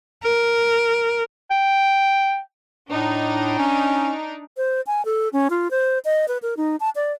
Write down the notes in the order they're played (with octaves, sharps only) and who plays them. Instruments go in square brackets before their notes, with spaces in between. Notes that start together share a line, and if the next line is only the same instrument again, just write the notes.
[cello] A#4
[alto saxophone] G5
[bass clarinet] A2 [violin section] D4 D#4
[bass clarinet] C#4
[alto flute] C5
G#5
A4
C#4
F4
C5
D#5
B4
A#4
D#4
A5
D5